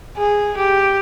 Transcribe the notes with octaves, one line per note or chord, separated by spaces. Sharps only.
G#4
G4